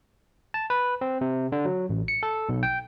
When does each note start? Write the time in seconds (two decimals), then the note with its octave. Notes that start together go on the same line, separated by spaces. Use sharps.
0.54 A5
0.70 B4
1.01 C4
1.21 C3
1.52 D3
1.65 F#3
1.89 A1
2.08 C#7
2.23 A4
2.49 B1
2.63 G5